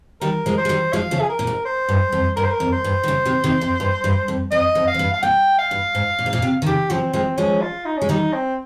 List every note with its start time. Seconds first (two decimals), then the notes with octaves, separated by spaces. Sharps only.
0.21 D#3 G3 A#4
0.46 F3 G#3
0.58 C5
0.65 G#3
0.69 D#3 G3
0.93 F3 G#3 F5
1.11 C#3 F3
1.21 G#4
1.29 A#4
1.39 A#2
1.47 G#2
1.65 C5
1.89 G2
2.12 F2
2.36 G2 A#4
2.44 C5
2.51 A#4
2.60 F2
2.72 C5
2.84 G2
3.03 D#3
3.08 C#3
3.25 C3 D#3
3.44 C3 D#3
3.61 F2
3.80 G2
4.04 G2
4.28 F2
4.52 F2 D#5
4.75 F2
4.87 F5
4.94 F2
4.99 G2
5.14 F5
5.23 A#2 G5
5.59 F5
5.71 G2
5.95 G#2
6.19 A#2
6.26 G#2
6.33 A#2
6.42 C3
6.62 D#3
6.66 C#3 G4
6.90 C#3 F3 C4
7.13 F3 G#3 C4
7.38 F3 G#3 C#4
7.62 F4
7.86 D#4
7.98 G#3 C#4
8.09 D#3 G3 D#4
8.33 C4